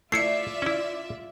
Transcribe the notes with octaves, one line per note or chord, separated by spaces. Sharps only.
A3 E4 F4 D5 E5 C7 C#7
C#4 E4